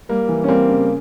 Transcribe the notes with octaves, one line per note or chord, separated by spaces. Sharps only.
G3 A#3
E3
C#4
G3 A#3 C4
C#3